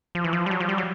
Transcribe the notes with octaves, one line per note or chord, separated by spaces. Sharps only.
F3
E3
F3
G3
F#3
F3
G3
F#3